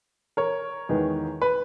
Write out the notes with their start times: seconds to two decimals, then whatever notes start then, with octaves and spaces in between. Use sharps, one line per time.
0.37 A#4 C#5
0.89 E2 D#3 G#3 B3
1.42 B4